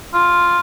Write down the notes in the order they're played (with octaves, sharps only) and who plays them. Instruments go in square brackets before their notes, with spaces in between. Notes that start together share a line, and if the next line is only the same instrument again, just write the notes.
[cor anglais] F4